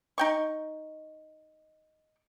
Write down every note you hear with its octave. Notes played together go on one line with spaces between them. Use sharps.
D#4 G5 C#6